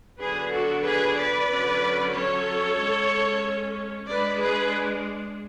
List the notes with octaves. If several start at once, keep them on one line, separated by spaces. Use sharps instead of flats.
D3 F#3 B3 D4 G#4 B4
F#4 A4
G#4 B4
B4 D5
D3 F#3 C#4
A4 C#5
G#3 C#4
G#3 D4 B4 D5
G#4 B4